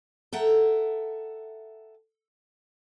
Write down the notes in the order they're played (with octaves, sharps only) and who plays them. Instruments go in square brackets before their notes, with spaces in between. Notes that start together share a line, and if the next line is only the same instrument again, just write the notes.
[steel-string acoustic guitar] A4 E5 F#5 G5 A#5